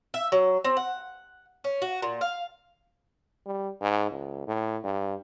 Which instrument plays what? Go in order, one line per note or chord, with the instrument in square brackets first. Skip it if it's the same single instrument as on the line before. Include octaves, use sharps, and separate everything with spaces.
[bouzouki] E5
F#3
C4
F#5
C#4
F#4
A#2
F5
[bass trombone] G3
G#2
C#2
A2
G2